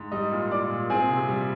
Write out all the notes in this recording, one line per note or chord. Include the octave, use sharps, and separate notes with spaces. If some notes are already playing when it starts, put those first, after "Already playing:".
Already playing: G#2
G3 D#5 D#6
A#2
A#2 D5 D6
A#2
C4 G#4 G#5
C3
G3